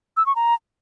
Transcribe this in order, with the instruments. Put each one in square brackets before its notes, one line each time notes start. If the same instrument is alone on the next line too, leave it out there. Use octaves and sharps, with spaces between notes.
[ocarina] E6
C#6
A#5